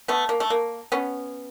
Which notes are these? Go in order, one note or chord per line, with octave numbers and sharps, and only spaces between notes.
A3 B3
A#3
A3
A#3
B3 C#4